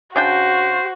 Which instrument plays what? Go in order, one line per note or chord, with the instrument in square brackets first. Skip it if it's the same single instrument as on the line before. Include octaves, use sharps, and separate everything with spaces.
[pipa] C#3 D4 G5 [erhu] F#4 [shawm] C5